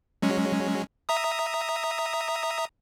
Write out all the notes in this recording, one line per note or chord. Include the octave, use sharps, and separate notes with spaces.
F#3 G#3 C#4
E5 A#5 D#6